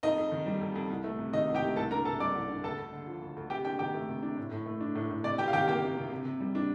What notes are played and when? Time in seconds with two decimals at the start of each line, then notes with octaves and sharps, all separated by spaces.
0.03 F2 D#4 D#5
0.18 F2
0.32 D#3
0.46 G3
0.61 F2
0.75 F2
0.90 C2
1.04 A3
1.19 C3
1.33 D#3 D#4 D#5
1.48 C2
1.55 G4 G5
1.63 A3
1.76 C2 A4 A5
1.91 D4 A#4 A#5
2.05 C3 A4 A5
2.20 G3 D5 D6
2.35 C2
2.49 D4
2.63 D2 A4 A5
2.78 D2
2.93 D3
3.07 F3
3.22 D2
3.36 D2
3.50 C3 G4 G5
3.65 D4 G4 G5
3.79 D#3 G4 G5
3.94 A3
4.08 C3
4.23 D4
4.37 A2
4.51 A2
4.66 A3
4.80 D4
4.95 A2
5.11 A2
5.24 C3 D5
5.38 C3 G4 G5
5.48 F5
5.53 D#3 G4 G5
5.68 A#3 G4 G5
5.82 C3
5.97 C3
6.12 C3
6.25 C3
6.40 G3
6.55 D4